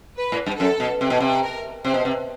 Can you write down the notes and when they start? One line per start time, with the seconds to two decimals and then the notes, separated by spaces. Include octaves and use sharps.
0.18 B4
0.32 A2
0.46 G2
0.60 F#2 A4
0.80 B2
1.01 C3
1.10 B2
1.20 C3
1.43 A#4
1.85 C3 C5
1.94 B2
2.05 C3